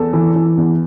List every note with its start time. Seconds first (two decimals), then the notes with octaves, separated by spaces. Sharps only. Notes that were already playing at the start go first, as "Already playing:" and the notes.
Already playing: E2 A4
0.13 E3
0.36 E3
0.57 E2